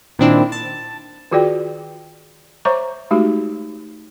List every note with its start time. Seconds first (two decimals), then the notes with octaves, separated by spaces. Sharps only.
0.19 A#2 D#3 C4 D4 E4
0.52 A5
1.31 D#3 F4 F#4 G#4 D5 G5
2.65 C5 C#5 E5 A#5 C#6 D6
3.11 G#3 A3 D#4 F#4 G4